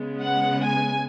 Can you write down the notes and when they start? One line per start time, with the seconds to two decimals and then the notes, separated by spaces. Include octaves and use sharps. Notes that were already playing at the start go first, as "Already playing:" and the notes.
Already playing: C#3 G#3 B3
0.22 F#5
0.64 G#5